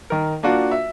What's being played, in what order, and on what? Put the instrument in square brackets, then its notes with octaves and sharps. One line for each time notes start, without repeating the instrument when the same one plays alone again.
[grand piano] D#3 A#4
A#3 D4 F4 F#4
E5